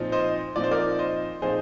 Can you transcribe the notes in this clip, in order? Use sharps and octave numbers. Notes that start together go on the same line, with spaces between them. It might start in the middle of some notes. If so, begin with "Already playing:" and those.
Already playing: A#2 F3 C4 D#4
C5 D#5
A#2 F3 C4 D#4 D5
C5
A#4 D5
C5 D#5
A#2 F3 C4 D#4 G#4 C5